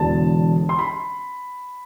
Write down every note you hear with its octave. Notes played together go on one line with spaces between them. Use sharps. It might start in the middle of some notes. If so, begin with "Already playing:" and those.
Already playing: E1 E2 D3 A5
C6
B5